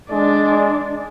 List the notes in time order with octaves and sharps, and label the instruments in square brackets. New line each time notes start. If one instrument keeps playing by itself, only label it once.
[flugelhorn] G#3 [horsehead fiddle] D4 D5